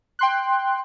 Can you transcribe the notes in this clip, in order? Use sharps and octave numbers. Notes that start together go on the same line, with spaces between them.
G5 C6 F#6